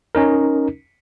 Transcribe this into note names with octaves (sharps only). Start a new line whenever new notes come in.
C#4 D#4 A#4